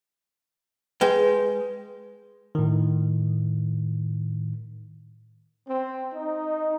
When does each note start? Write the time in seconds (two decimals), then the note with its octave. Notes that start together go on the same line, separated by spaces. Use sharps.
1.01 G#3 B4 G5
2.55 A2 D#3
5.68 C4
6.14 D#4